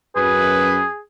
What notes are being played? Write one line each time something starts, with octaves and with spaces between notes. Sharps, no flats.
F#2 G#4 B4